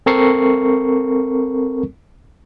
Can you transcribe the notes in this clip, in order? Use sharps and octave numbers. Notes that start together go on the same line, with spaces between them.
C4 A4 A#4 C#6 C7 C#7